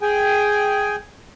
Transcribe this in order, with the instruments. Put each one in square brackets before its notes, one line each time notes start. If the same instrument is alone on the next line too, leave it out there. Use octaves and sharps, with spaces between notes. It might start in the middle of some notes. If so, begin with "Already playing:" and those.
[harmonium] G#4 G5 G#5